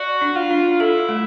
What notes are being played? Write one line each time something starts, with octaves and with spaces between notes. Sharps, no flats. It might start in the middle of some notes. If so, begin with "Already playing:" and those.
Already playing: F#4 D5
D4
F4
D4
E4 A4
A3